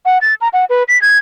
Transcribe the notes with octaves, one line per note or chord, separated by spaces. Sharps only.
F#5
A6
A#5
F#5
B4
B6
G#6